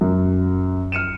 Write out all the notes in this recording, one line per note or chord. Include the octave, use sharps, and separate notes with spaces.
F#2
F6 C#7 D#7 E7